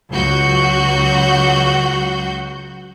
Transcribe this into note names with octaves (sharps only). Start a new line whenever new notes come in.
C#2 F#3 F#4 G6